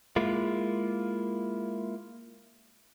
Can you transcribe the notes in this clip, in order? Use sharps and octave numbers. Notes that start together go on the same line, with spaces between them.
G#3 A#3 E4 F4